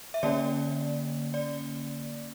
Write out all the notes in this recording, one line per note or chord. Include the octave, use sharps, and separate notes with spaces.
E5
D3 A#3 C#4 D5
D5